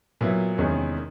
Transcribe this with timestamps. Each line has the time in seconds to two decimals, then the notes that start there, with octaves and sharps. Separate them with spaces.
0.21 A#2 F#3 B3 E4
0.58 E2 C3 D#3 G#3 C#4